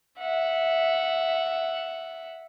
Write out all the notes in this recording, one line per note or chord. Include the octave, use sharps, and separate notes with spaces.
E5 F#5